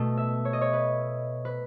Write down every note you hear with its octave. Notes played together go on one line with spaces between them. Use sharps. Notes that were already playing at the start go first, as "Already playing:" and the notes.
Already playing: B2 A3
E5
C#5
D#5
C#5
B4
B4